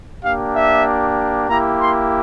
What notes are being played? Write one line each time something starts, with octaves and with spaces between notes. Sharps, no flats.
A#3 D4 G4 F5
E5
A#3 E4 G4 A#5
C6